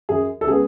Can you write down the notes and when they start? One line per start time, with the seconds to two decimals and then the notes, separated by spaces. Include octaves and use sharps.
0.09 F#2 G#4
0.41 A4
0.47 C#3 G#3 B3 G#4